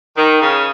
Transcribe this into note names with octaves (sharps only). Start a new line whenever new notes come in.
D#3
C#3